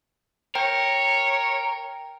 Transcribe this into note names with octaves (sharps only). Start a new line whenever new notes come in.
A#4 C#5 G5